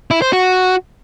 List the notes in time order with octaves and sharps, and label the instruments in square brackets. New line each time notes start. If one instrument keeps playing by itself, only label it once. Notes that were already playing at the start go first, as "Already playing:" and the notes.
[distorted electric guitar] E4
C5
F#4